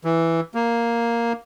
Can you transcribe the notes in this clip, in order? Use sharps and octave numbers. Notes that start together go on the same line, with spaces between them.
E3
A#3